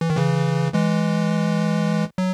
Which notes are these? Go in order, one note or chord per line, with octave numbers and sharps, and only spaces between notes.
E3
D#3
C#3 E3
E3 G#3
F#3